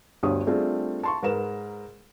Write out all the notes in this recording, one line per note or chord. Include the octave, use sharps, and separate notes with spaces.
G1 D2 G2 G4 C#5 D#6
G3 A3 C4 D4 F4 G#4
A5 C6 C#6
G#2 A#4 B4 E7